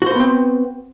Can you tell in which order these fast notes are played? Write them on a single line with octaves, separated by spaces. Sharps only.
F#4 C5 B4 B3 C4